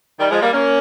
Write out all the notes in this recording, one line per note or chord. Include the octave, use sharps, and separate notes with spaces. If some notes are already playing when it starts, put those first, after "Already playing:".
D#3 G3
F3 G#3
G3 A#3
A#3 C#4